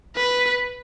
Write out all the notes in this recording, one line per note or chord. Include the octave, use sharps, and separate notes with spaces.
B4